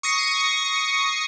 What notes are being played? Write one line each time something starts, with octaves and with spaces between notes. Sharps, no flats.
C#6 D#6 A#6 C7 C#7